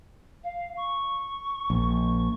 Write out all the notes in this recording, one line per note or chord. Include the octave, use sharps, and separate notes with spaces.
F5
C#6
A#1